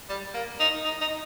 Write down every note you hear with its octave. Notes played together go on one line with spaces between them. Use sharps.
G3
A#3
D#4
D#4
D#4